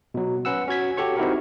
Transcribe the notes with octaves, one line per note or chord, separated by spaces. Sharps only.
B2 F#3
C#4 B4 F#5 E6
C#4 F#4 G#6 B6
F#4 G4 A4 C#5 C#6
C4 D#4 E4 F#4 G4 A#4